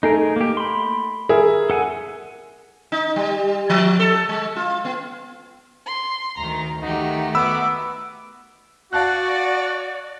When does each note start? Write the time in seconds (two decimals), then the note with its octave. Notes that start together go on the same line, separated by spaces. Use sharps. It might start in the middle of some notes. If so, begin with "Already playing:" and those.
0.03 A3 D#4 G#4 A#4
0.36 A#3 G4
0.57 B5 C6
1.29 G#4 A#4 E5
1.70 A4 F#5 G#5
2.92 D#4
3.16 G3
3.70 F3
3.99 A4
4.29 G#3
4.56 F4
4.85 B3
5.86 C6
6.37 D2 D#3 A#5
6.82 D#3 A3 D#4 F#4 G4
7.35 B3 F#4 B5 D6 E6
8.93 F#4 D5 F5 A5 F#6